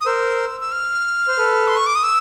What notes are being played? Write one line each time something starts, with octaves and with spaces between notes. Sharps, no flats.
D#6
A#4 C5 E6
E6
F6
C5
A4 B4
C6
C#6
D6
D#6
E6